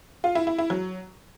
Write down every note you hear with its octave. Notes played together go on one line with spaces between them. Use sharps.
F4
E4
E4
E4
F#3